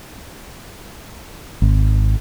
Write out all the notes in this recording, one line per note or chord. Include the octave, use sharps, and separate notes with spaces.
G#1